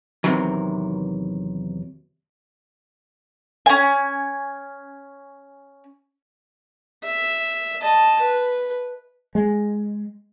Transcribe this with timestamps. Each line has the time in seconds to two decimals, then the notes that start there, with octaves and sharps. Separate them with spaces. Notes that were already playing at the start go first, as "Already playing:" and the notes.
0.24 E2 A2 C3 D#3 E3 F#3
3.66 C#4 G#5
7.04 E5
7.81 D#5 A5
8.22 B4
9.35 G#3